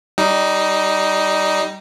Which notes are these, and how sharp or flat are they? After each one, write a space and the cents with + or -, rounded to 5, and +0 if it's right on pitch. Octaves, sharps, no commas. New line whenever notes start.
G3 -15 D#4 +0